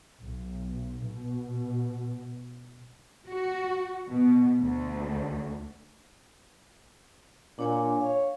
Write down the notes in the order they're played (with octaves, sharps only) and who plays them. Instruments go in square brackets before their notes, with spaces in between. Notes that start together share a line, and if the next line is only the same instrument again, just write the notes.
[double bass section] B1
B2
[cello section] F#4
B2
D2
[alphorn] A#2 [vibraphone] D4 C#5 G#5
[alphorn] C#5 [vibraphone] F5